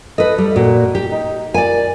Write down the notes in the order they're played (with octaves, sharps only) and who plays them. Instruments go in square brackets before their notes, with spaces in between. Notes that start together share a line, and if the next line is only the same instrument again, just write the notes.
[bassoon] A4 [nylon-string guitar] B4 D#5
[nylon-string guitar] G3
[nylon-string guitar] A#2 [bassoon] F#4
[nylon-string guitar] G4
[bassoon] D#4
[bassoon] A#2 [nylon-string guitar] D5 G#5